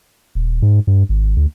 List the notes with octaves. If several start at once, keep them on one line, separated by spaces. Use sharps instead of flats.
D#1
G#2
G2
G#1
D2